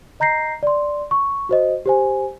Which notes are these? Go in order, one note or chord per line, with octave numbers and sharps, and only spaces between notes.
D#5 A#5 G6 A#6 C7
D5 C6
C#6
F#4 C5 D#5
G4 C5 G#5